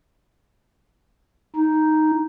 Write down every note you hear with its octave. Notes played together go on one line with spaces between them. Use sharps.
D#4